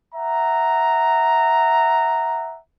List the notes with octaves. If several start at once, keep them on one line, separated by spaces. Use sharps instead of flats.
E5 F#5 A#5